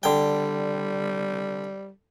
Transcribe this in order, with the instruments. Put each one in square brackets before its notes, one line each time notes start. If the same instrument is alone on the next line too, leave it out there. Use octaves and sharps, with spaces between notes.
[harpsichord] D3 G5 [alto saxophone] G3